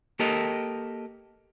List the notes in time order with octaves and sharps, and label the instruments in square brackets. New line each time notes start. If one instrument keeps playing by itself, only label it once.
[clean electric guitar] A#3 G4 A4 A#4 D#5